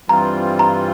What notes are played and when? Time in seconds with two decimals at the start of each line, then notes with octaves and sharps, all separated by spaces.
0.09 G2 E3 G3 C4 F4 A#5
0.59 A#5